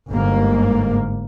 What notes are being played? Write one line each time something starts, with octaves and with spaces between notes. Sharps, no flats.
G1 G#2 A#3